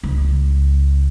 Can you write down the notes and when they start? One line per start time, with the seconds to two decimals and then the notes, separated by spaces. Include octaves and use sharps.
0.03 C#2